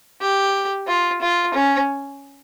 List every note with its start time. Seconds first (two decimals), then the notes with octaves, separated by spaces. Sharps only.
0.21 G4
0.88 F4
1.22 F4
1.54 C#4